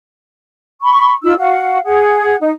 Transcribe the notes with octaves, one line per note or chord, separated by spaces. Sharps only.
B5 C#6
D#4 F4 E6
F#4 F5 F#5
G#4 F#5
D#4